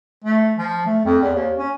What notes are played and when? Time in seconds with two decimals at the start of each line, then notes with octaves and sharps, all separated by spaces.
0.24 A3
0.58 F3
0.86 A3
1.05 F2
1.22 E2
1.35 D#2
1.58 C#4